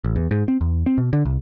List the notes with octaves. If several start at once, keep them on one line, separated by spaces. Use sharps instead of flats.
A1
E2
G#2
C4
E2
C4
B2
D3
C2